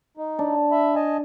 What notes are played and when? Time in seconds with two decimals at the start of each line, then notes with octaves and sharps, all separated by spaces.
0.17 D#4
0.39 D4
0.71 E5 B5
0.95 D#5 G#5 A5